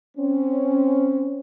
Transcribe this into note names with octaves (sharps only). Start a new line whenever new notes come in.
C4 C#4